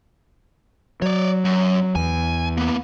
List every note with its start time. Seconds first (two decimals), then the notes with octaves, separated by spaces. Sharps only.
1.02 F#3 C#5 D5
1.45 F#2
1.95 E2 G#5
2.57 A#3 B3